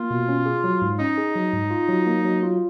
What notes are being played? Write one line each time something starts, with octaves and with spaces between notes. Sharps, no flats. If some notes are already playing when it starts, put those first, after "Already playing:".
Already playing: A#3 F4
B2
C#4
G#4
F#3
G#2
C#4 D#4
G#4
F#3
G#2
F4
F#3
A#3
F#3
F4